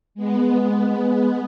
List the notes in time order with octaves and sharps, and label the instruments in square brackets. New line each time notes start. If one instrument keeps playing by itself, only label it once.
[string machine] G#3 B3